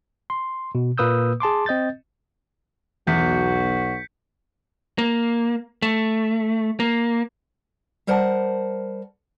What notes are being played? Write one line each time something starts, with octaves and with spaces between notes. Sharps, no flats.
C6
B2
A#2 A#3 B4 D#6 E6 G6
G#4 A5 C6 D6
C4 D#5 G6 A6
B1 E2 F#4 G6 B6 C#7
A#3
A3
A#3
G3 A#4 C5 F#5 A5